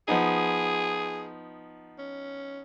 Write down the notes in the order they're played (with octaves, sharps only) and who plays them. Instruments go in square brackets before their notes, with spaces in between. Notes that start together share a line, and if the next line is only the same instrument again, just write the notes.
[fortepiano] F3 B3 D#4 [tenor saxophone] G#4
[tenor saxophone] C#4